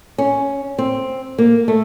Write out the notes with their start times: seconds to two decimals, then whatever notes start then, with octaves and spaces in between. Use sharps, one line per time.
0.18 C#4
0.78 C4
1.38 A#3
1.68 A3